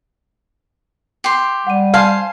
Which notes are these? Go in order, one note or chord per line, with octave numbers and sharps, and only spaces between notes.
G4 C6
G3 F#5 D#7
C5 F5 G#5 A5